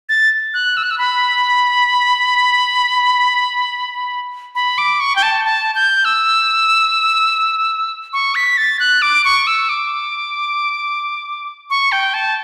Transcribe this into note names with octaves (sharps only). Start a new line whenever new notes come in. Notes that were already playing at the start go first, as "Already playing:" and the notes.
A6
F#6
E6
F#6
E6
B5
B5
D6
C#6
G5
A5
A5
G6
E6
C#6
B6
A6
F#6
D6
C#6
E6
D6
C#6
G5
A5